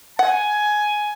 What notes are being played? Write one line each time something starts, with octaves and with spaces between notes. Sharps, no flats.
F#5 G#5